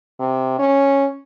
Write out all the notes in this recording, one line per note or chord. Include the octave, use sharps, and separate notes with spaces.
C3
C#4